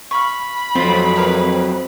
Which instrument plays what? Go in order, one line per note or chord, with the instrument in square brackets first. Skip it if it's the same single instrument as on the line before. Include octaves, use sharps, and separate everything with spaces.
[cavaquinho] F5 C#6 [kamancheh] B5
[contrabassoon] F2 [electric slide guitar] F#3 C4 [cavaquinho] F4
[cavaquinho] E4 A#4 B4